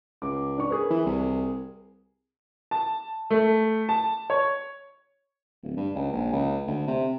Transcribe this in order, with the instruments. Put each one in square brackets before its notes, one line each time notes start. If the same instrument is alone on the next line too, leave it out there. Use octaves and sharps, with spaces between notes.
[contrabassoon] C#2 [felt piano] D6
[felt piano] D4 C#6
G#4 A#4 B4
[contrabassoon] E3
C2
[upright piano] A5
A3
A5
C#5
[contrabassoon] D1
G2
C#2
A#1
C#2
D2
C3